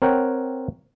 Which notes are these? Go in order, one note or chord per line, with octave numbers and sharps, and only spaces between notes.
C4 A#4 C#5 F#5 G5